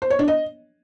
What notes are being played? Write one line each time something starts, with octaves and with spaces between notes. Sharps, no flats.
C5
C#5
D4
D#5